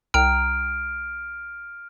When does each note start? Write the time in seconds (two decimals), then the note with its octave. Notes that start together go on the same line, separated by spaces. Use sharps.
0.14 C2 G5 A#5 F6 D7